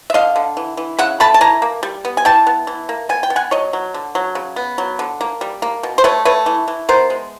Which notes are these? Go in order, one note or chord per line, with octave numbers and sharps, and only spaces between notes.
E5
D3 D#5 F5
D3
E3
E3
C#3 E5 F#5
A3 A5 B5
A5
E3 G#5 A#5
A#3
G3
B3
G#5
E3 G5 A5
B3
E3
A#3
B3 G#5
G5
B3
F#5 G#5
F#3 C#5 D#5
F#3
D3
F#3
C#3
B3
F#3
D3
A#3
G3
A#3
B2
C5
A3 B4 C#5
A3 B4 C#5
E3
E3
B3 A#4 C5
G#3